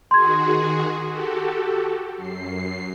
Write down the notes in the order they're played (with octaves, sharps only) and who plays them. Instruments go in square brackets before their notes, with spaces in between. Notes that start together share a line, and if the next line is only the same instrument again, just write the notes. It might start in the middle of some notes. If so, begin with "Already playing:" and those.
[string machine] D#3 F#4 G#4 [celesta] C6 G#6
[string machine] F#4 G4 A4
F#2 C7